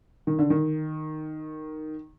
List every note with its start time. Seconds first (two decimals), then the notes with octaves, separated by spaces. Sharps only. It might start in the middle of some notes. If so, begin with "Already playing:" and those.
0.27 D#3
0.39 D3
0.50 D#3